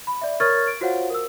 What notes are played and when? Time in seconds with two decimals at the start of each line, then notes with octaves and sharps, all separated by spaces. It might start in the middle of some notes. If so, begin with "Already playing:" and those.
0.07 B5
0.22 D5 E5
0.40 A#4 C#5 C#6 F6 G#6 A6
0.67 D7
0.81 F4 F#4 C5 C#5 F5 F#5
1.10 A#4 E6